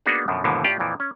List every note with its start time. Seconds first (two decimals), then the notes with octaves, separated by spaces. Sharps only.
0.06 A#3 B3 D4 D#4 F#4 G#4
0.28 F#2 B2 D3 F3
0.44 D#2 G#2 B2 D3 E3 F3
0.64 A2 F4 G4 D5
0.79 F2 A#2 E3 F3
1.00 C#4